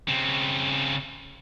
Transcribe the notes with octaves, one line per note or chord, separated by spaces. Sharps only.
C#3 C4